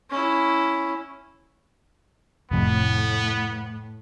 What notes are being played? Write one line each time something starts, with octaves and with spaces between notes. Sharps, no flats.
C#4 E4
F1 F2 A2 B3